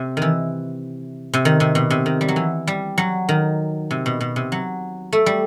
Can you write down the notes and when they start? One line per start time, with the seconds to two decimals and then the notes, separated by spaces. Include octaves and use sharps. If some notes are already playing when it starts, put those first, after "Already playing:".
Already playing: C3
0.17 D#3 E3
1.34 C3
1.45 D#3
1.60 C3
1.75 B2
1.90 C3
2.06 D#3
2.21 G3
2.28 F#3
2.36 E3
2.67 G3
2.98 F#3
3.29 D#3
3.91 C3
4.06 B2
4.21 B2
4.36 C3
4.52 F#3
5.13 A3
5.26 G3